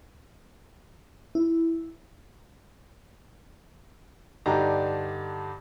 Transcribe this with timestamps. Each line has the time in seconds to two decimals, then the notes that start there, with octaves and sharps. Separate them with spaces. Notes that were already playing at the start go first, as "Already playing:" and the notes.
1.35 E4
4.46 G2 D3 D4 D#4 G4 A#5